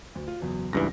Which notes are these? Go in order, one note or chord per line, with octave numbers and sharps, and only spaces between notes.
D2
F4
F#1 E2 F#3
C#2 G2 E3 A#6